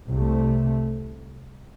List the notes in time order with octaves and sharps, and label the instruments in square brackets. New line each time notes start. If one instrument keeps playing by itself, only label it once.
[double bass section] C2 C3 A3